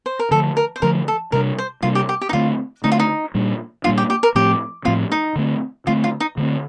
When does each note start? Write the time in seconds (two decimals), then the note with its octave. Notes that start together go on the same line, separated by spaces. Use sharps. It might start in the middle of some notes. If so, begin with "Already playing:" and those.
0.06 C5
0.19 A#4
0.31 D3 F3 A3 A4
0.57 A#4
0.76 C5
0.82 D3 F3 A3 A#4
1.08 A4
1.32 C3 G3 A#3 D4 A#4
1.58 C5
1.82 C3 G3 A#3 D4 F4
1.95 G4
2.09 G4
2.21 G4
2.29 D#4
2.33 D3 A3 C4 F4
2.84 D3 A3 C4 D#4
2.92 F4
2.99 D#4
3.35 A#2 G3 A#3 D4
3.84 A#2 G3 A#3 D4 F4
3.98 G4
4.10 G4
4.23 A#4
4.35 A2 F3 A3 C4 G4
4.85 A2 F3 A3 C4 F4
5.12 D#4
5.36 D3 A3 C4
5.87 D3 A3 C4 F4
6.04 F4
6.20 D#4
6.37 D3 A3 C4